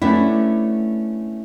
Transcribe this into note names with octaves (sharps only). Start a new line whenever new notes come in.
A3 B3 C#4 D4 E4